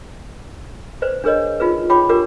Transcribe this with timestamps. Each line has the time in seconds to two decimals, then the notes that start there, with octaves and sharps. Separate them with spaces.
1.02 B4 C5 D5
1.24 D4 G#4 A#4 C#5 D#5
1.60 D#4 F4 G#4 B4
1.90 F4 C#5 G5 B5 D6
2.09 D4 F4 G4 A#4 D6